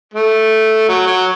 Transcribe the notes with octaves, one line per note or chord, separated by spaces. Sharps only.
A3
F#3
F#3